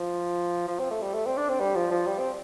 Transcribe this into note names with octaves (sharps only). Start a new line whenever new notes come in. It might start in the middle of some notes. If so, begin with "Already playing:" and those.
Already playing: F3
F3
C4
A3
G3
A3
C4
D4
C4
G3
F3
F3
G3
C4